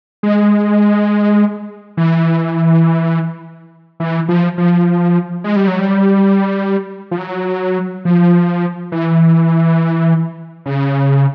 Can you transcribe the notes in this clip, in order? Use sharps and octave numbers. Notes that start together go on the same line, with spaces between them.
G#3
E3
E3
F3
F3
G#3
G3
F#3
G3
F3
F#3
F3
E3
C#3